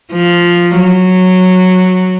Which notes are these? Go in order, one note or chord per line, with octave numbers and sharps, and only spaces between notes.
F3
F#3